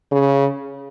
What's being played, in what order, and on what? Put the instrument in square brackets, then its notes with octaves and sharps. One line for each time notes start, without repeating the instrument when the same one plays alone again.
[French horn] C#3